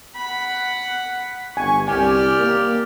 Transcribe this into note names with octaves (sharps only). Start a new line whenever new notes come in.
F#5 B5
G1 G#5 C#6
C2 G4 D5 G#5 F6
A#3